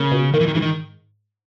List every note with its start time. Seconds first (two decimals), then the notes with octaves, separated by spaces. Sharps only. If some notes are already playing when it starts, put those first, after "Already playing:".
Already playing: C#3 A#3
0.12 B2
0.34 D#3 A#3
0.41 E3
0.48 D#3
0.55 G#2 E3
0.62 D#3